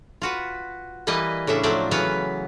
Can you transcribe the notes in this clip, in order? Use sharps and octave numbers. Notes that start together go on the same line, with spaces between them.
F4 F#4 B4
E3 G3 A#3 B4 D#5
A2 C#3 D4 E5
F3 F#3 A3 C5 D5 E5
C#3 E3 F#3 B3 B4 F5